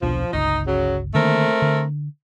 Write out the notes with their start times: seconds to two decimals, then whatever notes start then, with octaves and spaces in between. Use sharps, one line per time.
0.02 D#1 B1 F3 D4
0.33 G1 C#2 D#4
0.67 C#3 F#3
1.15 D3 D#3 A3 A#3 C4 A#4
1.62 D3